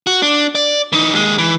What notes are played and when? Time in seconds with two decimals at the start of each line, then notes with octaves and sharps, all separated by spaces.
0.07 F#4
0.22 D4
0.55 D5
0.92 E3 D#4
1.13 D#2 G#3
1.38 E3